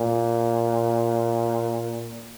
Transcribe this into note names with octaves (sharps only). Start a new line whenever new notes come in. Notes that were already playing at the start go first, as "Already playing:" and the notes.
Already playing: A#2